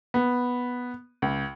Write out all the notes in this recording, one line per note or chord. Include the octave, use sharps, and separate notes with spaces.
B3
C#2